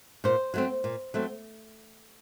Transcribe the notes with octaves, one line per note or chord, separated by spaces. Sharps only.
A#2 C5
F#3 A3 C4
A#2
F#3 A3 C4